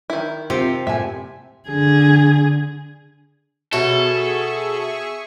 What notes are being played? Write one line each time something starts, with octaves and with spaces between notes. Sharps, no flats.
D#3 E4
C3 C4 F4 G4
A2 E5 G#5
D3 G#4
B2 F#3 E4 G#4 A4 C#5 E5 C#6